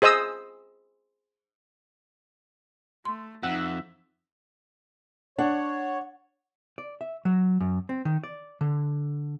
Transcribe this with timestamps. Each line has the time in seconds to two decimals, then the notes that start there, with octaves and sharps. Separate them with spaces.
0.02 G#4 C5 D#5 D#6 E6
3.05 A3 C6
3.43 F2 D#4 E5 F#5 E6 F#6
5.38 D4 C#5 F#5
6.78 D5
7.01 E5
7.25 F#3
7.60 F#2
7.89 C4
8.05 D#3
8.24 D5
8.61 D3